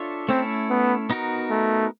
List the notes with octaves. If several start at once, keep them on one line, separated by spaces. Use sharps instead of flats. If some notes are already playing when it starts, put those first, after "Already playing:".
Already playing: D4 F4 A4 C#5 E5
A3 C4 C#4 E4 A4
B3
B3 D#4 F#4 A#4
A3